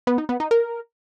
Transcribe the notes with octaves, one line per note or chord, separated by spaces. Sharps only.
B3
D#4
B3
D#4
A#4